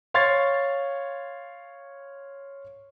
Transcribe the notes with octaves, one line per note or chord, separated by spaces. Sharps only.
C#5 F5 C6 C#6 G#6 A6